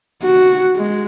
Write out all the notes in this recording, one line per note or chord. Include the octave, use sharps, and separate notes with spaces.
F#4
G#3